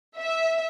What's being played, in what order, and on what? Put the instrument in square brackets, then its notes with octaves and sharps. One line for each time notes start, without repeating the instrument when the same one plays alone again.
[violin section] E5